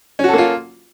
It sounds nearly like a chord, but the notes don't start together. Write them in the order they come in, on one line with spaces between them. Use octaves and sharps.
C#4 F#4 A4 A#3 F4